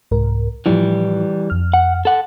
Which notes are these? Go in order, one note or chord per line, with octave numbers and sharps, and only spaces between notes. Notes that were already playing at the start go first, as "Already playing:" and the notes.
C2 G#2 A#4
A2 E3 F3 G3 E4
F2 F6
F#5
A4 F#5